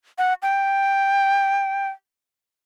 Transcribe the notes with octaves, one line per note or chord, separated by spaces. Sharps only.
F#5
G5